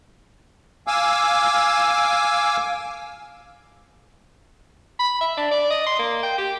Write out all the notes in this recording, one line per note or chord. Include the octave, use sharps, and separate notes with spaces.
F5 G#5 D6 E6
B5
E5
D4
D5
D#5
C6
A#3
G5
G4